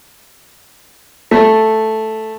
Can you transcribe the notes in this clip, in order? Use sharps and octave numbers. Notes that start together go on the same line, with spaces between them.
A3